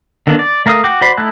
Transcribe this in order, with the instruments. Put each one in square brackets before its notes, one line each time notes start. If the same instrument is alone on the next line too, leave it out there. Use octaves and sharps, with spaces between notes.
[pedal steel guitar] D3 D#3 A#3 B3 D4
D5
A3 A#4 F5 F#5 D#6
F#4 F#5 G5 D6
F#4 C5 D5 B5 C6
A3 D#4 E4 A5 F#6